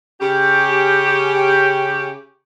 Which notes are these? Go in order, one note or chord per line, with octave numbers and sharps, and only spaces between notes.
C#3 C#4 G4